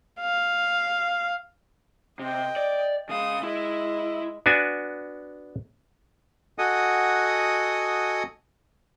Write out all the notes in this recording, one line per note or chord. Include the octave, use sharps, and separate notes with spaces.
F5
C3 D#5 G5
D5
C#3 G#3 F5 D#6
G#3 E4 D#5
B3 D4 F#4 G#5
F#4 A4 D#5 F#5 G#5 D#6